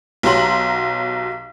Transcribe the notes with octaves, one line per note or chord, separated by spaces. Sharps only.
B1 F#3 G4 A#5 C6 F#7